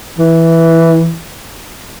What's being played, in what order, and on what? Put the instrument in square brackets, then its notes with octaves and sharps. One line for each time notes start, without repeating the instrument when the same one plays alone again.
[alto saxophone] E3